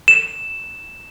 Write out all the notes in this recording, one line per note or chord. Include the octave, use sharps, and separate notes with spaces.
E7